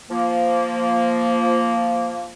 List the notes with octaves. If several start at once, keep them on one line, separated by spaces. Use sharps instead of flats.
F3 A#3